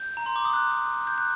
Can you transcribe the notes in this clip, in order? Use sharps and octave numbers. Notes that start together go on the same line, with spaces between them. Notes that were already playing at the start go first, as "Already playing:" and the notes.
Already playing: G6
A#5
C6
D6
D#6
F#6
G6
F#6